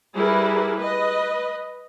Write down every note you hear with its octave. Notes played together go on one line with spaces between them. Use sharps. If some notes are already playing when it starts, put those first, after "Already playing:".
G3 E4 G#4 A#4 B4
B4 D#5